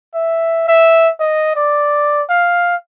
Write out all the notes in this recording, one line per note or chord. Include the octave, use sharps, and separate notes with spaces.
E5
E5
D#5
D5
F5